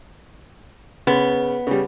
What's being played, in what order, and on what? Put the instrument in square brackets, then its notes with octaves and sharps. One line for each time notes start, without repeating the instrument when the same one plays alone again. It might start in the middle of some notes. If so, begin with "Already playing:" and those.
[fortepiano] C#3 [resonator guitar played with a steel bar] B3
[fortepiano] C#3 G3